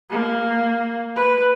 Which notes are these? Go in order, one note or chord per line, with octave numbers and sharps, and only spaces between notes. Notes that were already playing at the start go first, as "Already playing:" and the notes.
A#3
B4